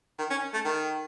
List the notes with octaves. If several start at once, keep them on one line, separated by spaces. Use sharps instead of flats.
D#3
C#4
A3
D#3